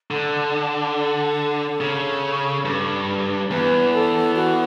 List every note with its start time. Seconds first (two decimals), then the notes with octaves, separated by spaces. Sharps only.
0.11 D3 A4
1.80 C#3
2.65 G2
3.51 E2 B4
3.93 A4
4.36 F#4